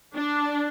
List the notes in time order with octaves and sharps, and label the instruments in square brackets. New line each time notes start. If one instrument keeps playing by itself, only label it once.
[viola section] D4